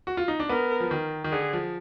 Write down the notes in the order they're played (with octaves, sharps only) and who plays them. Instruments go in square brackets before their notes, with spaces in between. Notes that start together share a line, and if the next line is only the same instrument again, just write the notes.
[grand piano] F#4
F4
D#4
D4
[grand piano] B3 [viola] A#4
[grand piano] F3
D#3
D#3
[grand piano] D3 [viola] G#4
[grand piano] F3